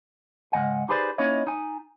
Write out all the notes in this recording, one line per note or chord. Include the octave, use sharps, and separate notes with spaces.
C#2 G#2 E3 D#5 F#5 G#5
D#4 G4 G#4 B4 C5 D5
A#3 C#4 D#4 E4 C#5 D#5
D#4 G#5